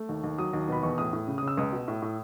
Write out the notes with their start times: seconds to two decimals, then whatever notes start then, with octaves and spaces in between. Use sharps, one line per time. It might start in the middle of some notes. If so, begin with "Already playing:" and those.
Already playing: A3
0.09 D#2
0.24 D#2
0.38 F#3 D#6
0.53 D#2
0.68 B2 B5
0.83 E2 C#6
0.98 A2 D#6
1.13 A2
1.27 C#3
1.38 D#6
1.43 C#3 E6
1.57 C#2 D#6
1.73 B2
1.88 A2
2.02 A2